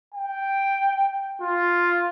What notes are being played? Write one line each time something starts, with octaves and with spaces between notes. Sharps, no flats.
G5
F4